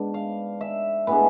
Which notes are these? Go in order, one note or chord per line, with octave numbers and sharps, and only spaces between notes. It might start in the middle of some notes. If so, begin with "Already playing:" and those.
Already playing: G#2 B3 D4
F5
E5
A2 G#3 B3 D4 B4